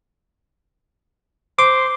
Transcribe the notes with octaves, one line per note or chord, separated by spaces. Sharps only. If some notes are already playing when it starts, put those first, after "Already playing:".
C5 D6